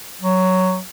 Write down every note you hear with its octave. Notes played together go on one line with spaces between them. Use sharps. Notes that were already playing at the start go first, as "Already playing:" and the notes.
F#3